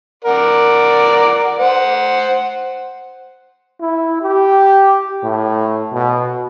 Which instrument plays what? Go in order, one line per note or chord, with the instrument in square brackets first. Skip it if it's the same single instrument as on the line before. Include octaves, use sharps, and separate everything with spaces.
[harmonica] A#4 D5 F#5
C5 F#5
[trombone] E4
G4
A2
B2